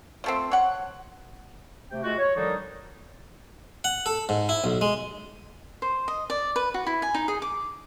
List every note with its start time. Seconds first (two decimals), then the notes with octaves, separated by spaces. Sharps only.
0.24 F3 A3 C4
0.52 C#5 F#5
1.91 C3 A3 G5
2.03 G#3 A3 F4 F#4
2.18 C#5
2.36 D3 D#3 F3 G3 D4 D#4
3.84 F#5
4.06 A4
4.29 G#2
4.49 E4
4.64 B1
4.81 G#3
5.82 C5
6.08 D#5
6.30 D5
6.56 B4
6.74 F#4
6.87 E4
7.02 G#5
7.14 D#4
7.28 G#4
7.42 D6